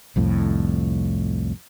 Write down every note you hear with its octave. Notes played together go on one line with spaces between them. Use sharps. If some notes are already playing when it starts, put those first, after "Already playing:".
C2 F2 A2